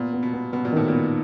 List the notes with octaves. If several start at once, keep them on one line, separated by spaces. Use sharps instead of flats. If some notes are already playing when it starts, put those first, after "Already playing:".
Already playing: A#2 B3
B3
B2
B3
B2 B3
A#2
A2 D#3
A#2 B3